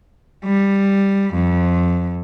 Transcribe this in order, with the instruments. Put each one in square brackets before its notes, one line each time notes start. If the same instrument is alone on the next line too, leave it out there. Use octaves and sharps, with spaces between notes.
[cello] G3
F2